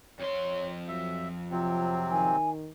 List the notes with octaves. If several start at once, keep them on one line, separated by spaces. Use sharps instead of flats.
F2 C#5 C6
F#3 E5
C3 F3 F#3 C4
D#3 G#5